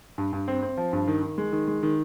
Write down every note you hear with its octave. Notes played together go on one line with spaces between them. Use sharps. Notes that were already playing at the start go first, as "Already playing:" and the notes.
G2
G2
C4
C4
F3
G2
D#3
D#3
G#3
D#3
G#3
D#3